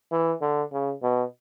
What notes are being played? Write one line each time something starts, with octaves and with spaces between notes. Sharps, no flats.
E3
D3
C#3
B2